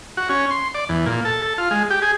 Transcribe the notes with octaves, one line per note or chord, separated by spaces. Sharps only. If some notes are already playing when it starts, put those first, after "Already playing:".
F#4
C#4
C6
D5
E2
A#2
A4
A4
F4
G#3
G4
G#4